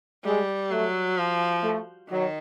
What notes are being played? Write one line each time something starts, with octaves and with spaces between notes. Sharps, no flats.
G3 G#3
F#3 A3
F3
A3
D#3 F#3